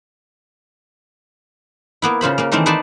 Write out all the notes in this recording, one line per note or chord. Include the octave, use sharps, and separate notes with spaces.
A#3 B3 E4
C#3 F4 C5 B5
C#3 A#3
D#3 E3 A3 A#3 C4
D#4 B4 C5 D5 G#5 A5